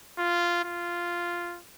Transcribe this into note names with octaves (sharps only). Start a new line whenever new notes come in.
F4
F4